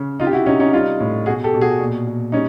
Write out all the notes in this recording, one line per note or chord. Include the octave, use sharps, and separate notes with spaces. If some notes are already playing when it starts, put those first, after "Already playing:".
Already playing: C#3
C3 D#4 F4
G4
E4 F#4
C3 C#4 D#4
C#4 D#4
G3 D#4 F4
A2
B2 F#4 G#4
G4 A4
B2
F#4 G#4
A#2
A#2
G3 C#4 D#4